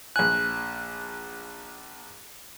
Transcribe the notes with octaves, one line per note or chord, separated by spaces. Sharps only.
A#1 G#5 F#6